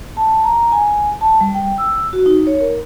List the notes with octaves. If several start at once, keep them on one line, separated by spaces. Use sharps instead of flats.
A5
A#5
G#5
A5
G3
G5
E6
F#4
D#4
C#5
A#4